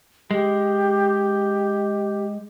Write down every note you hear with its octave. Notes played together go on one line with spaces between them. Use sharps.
G#3 G4